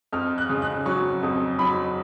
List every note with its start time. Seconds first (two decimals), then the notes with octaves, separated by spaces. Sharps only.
0.13 F2 F6
0.38 F#6
0.49 C#3
0.62 F#6
0.86 F#3 C#6
1.23 F2
1.59 F#3 B5